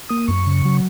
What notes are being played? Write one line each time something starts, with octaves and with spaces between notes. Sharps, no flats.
A#3 D#6
F#2 C#6
C#3
F#3